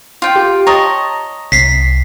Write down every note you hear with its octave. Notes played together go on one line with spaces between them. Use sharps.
F4 G5
G4
C#5 D#5 A5 A#5
C2 B6 C7